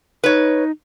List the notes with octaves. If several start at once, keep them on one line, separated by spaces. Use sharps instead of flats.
D#4 B4 C#5